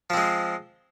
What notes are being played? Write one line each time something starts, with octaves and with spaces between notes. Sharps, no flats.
F3 G#3 C4